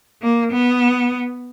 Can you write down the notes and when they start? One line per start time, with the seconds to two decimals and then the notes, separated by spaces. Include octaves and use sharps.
0.22 A#3
0.52 B3